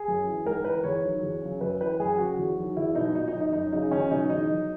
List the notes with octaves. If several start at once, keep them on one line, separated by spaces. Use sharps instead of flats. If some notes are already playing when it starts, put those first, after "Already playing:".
Already playing: G#4
F#2
E3
G#2 A#4
E3 B4
E2 C#5
D#3 F#3
E2
C#3 F#3
F#2 B4
E3 B4
F#2 G#4
C#3 F#3 F#4
E2
D#3 F#3
E2 E4
B2 F#3 D#4
A#2 D#4
D#4
F#3
D#4
F#2 D#4
C#3 F#3 D#4
E2 C#4
B2 F#3 D#4
E2 D#4
D#3 F#3